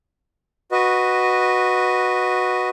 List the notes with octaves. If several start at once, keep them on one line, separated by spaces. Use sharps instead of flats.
F#4 B4 D#5